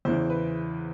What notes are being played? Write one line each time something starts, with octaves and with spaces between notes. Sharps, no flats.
E2 C#3 E3 C5
B4